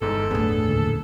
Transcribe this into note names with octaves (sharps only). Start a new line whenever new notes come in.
G1 E2 G#2 A4
E2 A2 B3 D4 G#4
D2 A#2